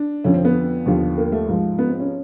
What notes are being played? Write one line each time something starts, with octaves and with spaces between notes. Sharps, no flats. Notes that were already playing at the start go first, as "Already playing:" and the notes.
Already playing: D4
F2 D3 F3 C#4
C4
B3
D#2 D3 F3
A#3
A3
G#2 F3
B3
C4
C#4